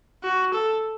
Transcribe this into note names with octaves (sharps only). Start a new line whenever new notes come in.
F#4
A4